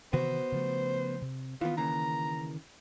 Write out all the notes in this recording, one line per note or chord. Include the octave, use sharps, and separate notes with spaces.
C3 D#3 E3 B3 F#4 C5
C#3 F3 A3
C3
D#3 E3 B3 F4
C#3 E3 A#3 A#5